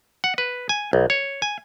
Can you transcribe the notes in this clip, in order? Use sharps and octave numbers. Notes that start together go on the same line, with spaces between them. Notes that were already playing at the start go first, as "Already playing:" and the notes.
F#5
B4
G#5
B1
C#5
G#5